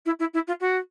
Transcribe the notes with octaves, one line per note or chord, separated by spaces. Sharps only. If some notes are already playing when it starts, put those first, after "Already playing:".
E4
E4
E4
F4
F#4